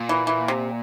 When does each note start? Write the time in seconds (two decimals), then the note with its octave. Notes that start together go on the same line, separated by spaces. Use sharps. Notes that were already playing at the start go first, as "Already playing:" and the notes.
Already playing: A#2
0.09 E3
0.27 E3
0.48 C3